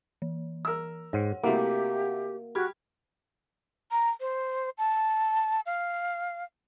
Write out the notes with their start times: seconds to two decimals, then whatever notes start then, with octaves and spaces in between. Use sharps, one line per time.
0.22 E3
0.65 A#4 E6
1.13 G#2 C#5 F#5
1.44 C3 A3 A#3 E4 F#4 G4 E5 F#5
2.55 F#4 G4 B5 F6 G#6
3.91 A#5
4.20 C5
4.78 A5
5.66 F5